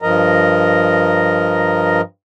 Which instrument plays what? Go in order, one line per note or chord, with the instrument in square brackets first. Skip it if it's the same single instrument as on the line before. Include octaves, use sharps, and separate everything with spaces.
[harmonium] G2 F3 A#4 D#5 A#5